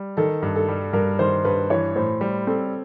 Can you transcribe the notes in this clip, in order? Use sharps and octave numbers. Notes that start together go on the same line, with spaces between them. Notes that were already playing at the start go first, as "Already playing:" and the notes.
Already playing: G3
D#3 A4
G2
A4
G3
G2 A#4
D#3 C5
G2 B4
E3 C#5
A2 C5
G3 C5
C4 A4